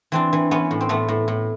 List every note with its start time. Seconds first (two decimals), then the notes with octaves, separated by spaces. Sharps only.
0.12 E3 C4 D4
0.33 E3
0.51 E3 B3 C#4
0.71 A2
0.81 C4
0.89 A2 A3 B3
1.08 A2
1.28 A2